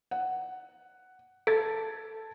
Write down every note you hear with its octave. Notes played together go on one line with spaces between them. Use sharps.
F#5
A4 A5 G#6 A6